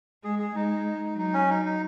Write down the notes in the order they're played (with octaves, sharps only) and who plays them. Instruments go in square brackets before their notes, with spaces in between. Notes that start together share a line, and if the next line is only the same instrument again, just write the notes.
[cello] G#3 [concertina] G#4
[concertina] G#4
[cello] G#3 [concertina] D#4
[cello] F#3 [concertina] D#4
[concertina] C#4
D#4
D#4